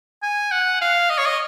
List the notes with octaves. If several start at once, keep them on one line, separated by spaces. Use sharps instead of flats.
G#5
F#5
F5
D#5
C#5
D#5